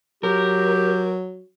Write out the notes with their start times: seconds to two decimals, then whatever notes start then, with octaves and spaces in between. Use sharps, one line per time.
0.23 F#3 G4 A#4